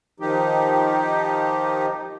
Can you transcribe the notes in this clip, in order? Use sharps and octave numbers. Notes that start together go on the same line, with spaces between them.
D#3 F3 D#4 G4